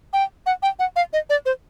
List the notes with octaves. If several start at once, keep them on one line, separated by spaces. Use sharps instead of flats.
G5
F#5
G5
F#5
F5
D#5
D5
C5